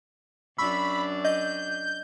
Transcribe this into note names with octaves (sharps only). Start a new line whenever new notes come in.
F#2 D4 B5 C#6 E6
D#5 G6